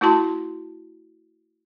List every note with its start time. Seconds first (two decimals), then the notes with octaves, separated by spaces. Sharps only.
0.01 A3 E4 F#4 A5 C6